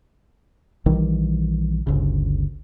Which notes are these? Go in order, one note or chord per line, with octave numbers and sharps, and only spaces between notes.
A#1 D#3 E3 G3
G1 D2 C#3